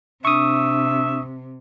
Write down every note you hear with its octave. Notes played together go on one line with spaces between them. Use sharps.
C3 D4 E5 C#6 D#6